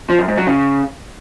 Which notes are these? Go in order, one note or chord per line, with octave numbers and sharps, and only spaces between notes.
F3
F#2
G#2
F#3
C#3